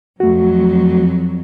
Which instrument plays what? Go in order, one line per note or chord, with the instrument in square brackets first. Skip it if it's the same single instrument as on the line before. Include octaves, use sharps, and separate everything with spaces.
[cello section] F2 F#3 [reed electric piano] A3 F#4